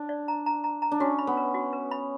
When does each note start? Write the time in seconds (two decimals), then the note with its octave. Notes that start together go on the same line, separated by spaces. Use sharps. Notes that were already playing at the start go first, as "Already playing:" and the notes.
Already playing: D4
0.09 D5
0.28 A#5
0.46 A#5
0.64 A#5
0.82 A#5
0.91 D4
1.00 C#4 F#4
1.19 B5
1.27 B3
1.37 B4
1.54 F#4
1.73 B4
1.91 B5